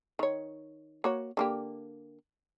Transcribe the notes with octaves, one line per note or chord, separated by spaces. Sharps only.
D#3 C#5
A#3 F#4 C#5
D3 A#3 G4